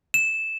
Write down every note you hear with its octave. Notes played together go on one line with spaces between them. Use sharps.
E7